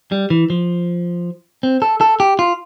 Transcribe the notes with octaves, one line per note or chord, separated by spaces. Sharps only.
G3
E3
F3
C4
A4
A4
G4
F4